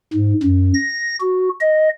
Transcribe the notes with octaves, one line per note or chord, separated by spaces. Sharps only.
G#2
F#2
A#6
F#4
D#5